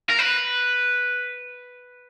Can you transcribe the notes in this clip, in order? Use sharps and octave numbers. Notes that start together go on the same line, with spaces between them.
A#4
B4